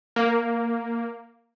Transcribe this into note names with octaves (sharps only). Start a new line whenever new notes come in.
A#3